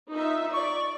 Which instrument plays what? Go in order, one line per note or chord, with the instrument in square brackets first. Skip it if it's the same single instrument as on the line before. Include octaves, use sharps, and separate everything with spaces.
[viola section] D#4 F4 E5
[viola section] D5 [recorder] C#6